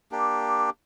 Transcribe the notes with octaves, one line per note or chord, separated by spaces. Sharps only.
A#3 D4 G4